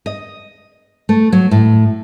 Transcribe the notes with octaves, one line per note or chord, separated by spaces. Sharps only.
D#5
A3
F#3
A2